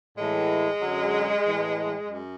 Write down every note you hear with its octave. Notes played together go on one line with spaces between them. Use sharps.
A2 E3 G#3
F#2 D3 F#3
A2 E3
F#2